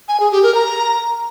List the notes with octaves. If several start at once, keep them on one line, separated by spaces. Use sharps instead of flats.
G#5
G#4
G4
A#4
A#5